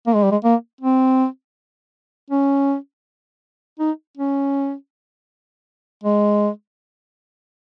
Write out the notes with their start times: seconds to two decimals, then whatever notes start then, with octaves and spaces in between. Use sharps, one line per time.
0.06 A#3
0.14 G#3
0.23 G3
0.31 G#3
0.43 A#3
0.81 C4
2.30 C#4
3.79 D#4
4.17 C#4
6.03 G#3